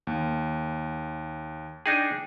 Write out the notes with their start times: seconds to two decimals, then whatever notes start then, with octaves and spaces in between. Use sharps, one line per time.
0.07 D#2
1.86 D4 D#4 G#4 G5